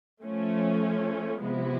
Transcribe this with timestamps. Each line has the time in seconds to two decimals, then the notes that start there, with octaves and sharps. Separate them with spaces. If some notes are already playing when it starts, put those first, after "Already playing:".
0.23 F3 A3 C#4
1.41 C3 F3 G#3 B3 E4